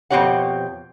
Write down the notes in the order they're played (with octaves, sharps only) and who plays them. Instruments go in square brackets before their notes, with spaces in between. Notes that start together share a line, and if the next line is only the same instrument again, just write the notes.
[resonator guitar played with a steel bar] F2 B2 C4 G4 C#5 F#5